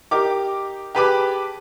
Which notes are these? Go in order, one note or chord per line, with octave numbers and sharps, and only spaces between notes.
D#4 G4 A#4 D6
G4 G#4 B4 A5 B5 D6